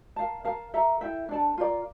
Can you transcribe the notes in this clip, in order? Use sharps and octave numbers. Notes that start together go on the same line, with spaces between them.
A#4 F5 A5
A#4 F5 A5
A4 E5 A#5
E4 A4 E5 G5
D4 A4 D5 A5
F4 A#4 D5